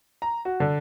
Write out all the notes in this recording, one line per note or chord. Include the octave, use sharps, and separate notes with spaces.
A#5
F#4
D3